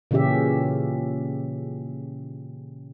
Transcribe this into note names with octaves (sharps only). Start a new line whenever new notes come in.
A#2 C#3 E3 C#4 G4 E5